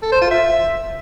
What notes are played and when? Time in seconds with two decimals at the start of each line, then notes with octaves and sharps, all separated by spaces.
0.02 A4
0.12 C5
0.21 F4
0.31 E5